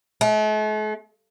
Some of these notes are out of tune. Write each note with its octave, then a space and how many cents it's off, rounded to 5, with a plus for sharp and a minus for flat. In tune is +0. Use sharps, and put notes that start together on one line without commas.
A3 -45